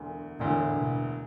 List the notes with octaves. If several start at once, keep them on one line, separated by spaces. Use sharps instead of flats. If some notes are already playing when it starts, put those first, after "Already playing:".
Already playing: E1 D2 D3
E1 D2 A2 D3
B2